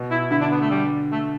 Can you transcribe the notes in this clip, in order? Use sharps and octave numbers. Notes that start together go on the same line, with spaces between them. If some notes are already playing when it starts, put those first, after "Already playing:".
Already playing: B2
E4
D3 E4
D4
B3
A3
G3
A3